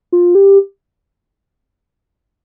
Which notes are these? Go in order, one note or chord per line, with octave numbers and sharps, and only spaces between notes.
F4
G4